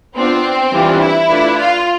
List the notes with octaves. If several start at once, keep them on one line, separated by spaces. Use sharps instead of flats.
B3 C4 D4 F4
E3 G3 D4 F4 B4
E4
A3 D4 F4 B4 D5
F4